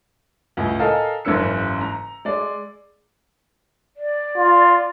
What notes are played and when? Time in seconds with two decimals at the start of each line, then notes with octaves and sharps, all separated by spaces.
0.57 C#2 A2
0.79 A4 A#4 D#5 F5 G#5
1.25 F#1 G#2 C#3 E3 E6 C#7
1.81 A#5
2.25 G#3 D5
3.97 D5
4.37 F4